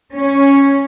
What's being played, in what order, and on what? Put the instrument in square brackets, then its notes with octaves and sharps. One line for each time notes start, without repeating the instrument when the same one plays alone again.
[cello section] C#4